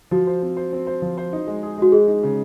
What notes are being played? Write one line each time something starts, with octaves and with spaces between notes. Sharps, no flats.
F3 F#4
C5
C4
C5
C4
C5
F3
C5
D#4
G#3
G#4
G#3 F#4
G#3 G#4
D#4
C#3